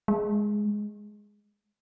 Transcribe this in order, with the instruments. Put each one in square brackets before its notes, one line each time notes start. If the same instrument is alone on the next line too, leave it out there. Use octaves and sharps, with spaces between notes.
[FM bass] G#3